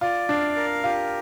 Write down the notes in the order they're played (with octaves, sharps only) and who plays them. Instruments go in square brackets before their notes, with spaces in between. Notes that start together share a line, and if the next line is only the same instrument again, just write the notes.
[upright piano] F4 [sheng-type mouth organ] D5
[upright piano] D4 [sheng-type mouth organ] F5
[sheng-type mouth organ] A#4
[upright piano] F4 [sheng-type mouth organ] G4